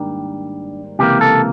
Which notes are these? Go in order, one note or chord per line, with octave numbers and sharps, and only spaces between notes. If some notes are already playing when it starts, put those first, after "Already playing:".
Already playing: G#2 D#3 G3 A#3 D4
C#2 C3 E3 G3 A#3 G4
A4